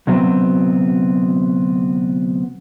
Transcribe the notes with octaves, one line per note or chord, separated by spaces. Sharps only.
D2 C3 F#3 B3 C4